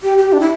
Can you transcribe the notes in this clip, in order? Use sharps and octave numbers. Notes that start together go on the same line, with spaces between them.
G4
G4
D4
E4